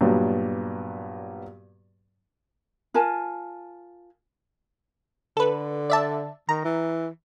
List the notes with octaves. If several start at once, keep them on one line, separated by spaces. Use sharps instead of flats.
G2 A#2 F#3 B3
F4 A#4 G#5 A5
D3 A4 B4
D5 E5 A5
D#3 A#5
E3